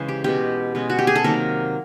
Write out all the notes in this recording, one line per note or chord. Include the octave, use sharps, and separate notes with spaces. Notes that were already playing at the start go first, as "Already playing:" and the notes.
Already playing: C#3 E3 G#3 C5
G4
B2 G#3 C#4 G4
B2 G#3 C#4
F#4
G4
G#4
A4
C3 D#3 F#3 A#3 A#4